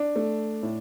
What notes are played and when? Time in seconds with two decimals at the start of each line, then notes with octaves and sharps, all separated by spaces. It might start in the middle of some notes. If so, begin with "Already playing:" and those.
Already playing: D4
0.16 A3
0.63 A2